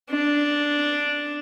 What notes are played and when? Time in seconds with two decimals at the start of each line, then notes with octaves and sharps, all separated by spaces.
0.10 D4